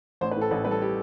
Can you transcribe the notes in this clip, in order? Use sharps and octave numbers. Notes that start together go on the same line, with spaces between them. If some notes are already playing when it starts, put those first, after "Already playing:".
A1 C5
B4
A2
A4
A1 B4
G3 B4
A4
G4